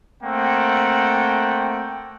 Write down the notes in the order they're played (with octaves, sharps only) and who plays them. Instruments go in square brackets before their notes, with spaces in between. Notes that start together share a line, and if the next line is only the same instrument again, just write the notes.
[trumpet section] A3 A#3 C4 F#5 G5